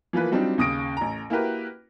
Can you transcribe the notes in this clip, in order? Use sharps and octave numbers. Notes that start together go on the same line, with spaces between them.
E3 F3 A#3 B4
F#3 G3 C4 D4 D#4 F4
D#2 C#3 D#6 A#6 D7
A1 A#5
A#3 E4 F#4 G4 A#4 B4